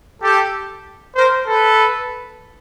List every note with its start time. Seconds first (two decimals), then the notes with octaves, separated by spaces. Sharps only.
0.22 G4 A4
1.15 A#4 C5
1.48 A4 B4